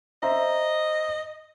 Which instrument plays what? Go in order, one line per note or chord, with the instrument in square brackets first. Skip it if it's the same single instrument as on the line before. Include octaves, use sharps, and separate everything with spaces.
[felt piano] C5 E5 A#5 [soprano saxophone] D#5